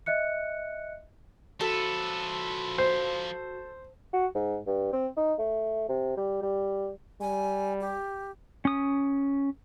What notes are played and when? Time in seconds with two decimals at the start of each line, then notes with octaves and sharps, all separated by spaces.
0.06 D#5 E5 F#6 C#7
1.61 F3 F#4 A4 B4
2.78 C5
4.13 F#4
4.35 G#2
4.67 G2
4.93 C4
5.17 D#4
5.39 A3
5.89 C3
6.17 G3
6.42 G3
7.21 G3 G#5
7.81 G4
8.65 C#4 D#6